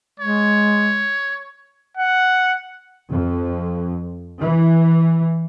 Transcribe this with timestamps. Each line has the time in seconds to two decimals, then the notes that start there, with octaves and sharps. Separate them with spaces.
0.20 G#3 C#5
1.97 F#5
3.11 F2
4.40 E3